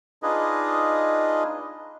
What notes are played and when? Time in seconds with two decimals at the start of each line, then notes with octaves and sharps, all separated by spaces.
0.23 D4 D#4 F4 G#4 B4 D#5